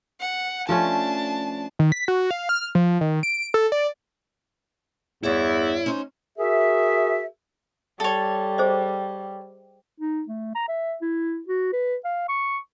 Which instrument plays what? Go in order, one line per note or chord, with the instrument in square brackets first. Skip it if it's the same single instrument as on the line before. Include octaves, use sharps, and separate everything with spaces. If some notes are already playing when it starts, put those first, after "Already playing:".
[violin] F#5
[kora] F3 A3 C#4 [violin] D4 A5
[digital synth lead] D#3
B6
F#4
F5
F6
F3
D#3
D7
A4
D5
[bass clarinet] E2 [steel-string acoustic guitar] G2 C#5 E5 [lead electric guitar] E4
[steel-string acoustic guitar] C#4 D#4 C5
[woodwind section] F#4 G#4 A#4 E5
[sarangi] G3 [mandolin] A4 C#5
[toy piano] G#4 C5 D#5
[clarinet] D#4
A3
A#5
E5
E4
F#4
B4
F5
C#6